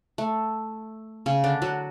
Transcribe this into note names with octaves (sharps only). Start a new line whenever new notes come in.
A3
C#3 C#4
D3 D4
F#3 F#4